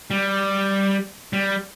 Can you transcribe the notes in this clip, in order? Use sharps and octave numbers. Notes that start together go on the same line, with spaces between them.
G3
G3